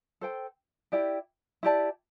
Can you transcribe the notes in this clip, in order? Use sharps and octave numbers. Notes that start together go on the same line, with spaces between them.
A4 C5 G5
E4 G4 D5 G5
E4 G4 D5 A5